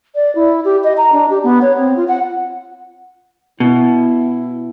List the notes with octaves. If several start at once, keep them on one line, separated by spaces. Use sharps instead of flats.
D5
E4
G4
D#5
A#5
D4
G4
B3
C#5
C4
F4
F#5
B2 E4